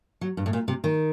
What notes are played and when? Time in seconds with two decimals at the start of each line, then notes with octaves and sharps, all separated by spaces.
0.21 F#3
0.37 G2
0.46 A2
0.53 A#2
0.68 C3
0.84 D#3